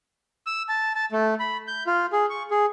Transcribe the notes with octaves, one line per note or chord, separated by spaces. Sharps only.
E6
A5
A5
A3
B5
G6
F4
G#4
C#6
G#4